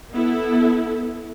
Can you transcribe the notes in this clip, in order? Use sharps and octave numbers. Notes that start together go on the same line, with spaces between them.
B3 E4 A4